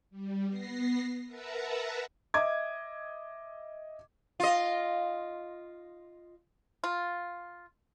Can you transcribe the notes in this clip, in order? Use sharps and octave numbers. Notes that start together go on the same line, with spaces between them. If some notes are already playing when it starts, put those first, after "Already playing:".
G3
B3 A#6 C7
A#4 B4 E5 F#5 A5 A#5
D#5 E5 D6 G#6
F4 D#5
F4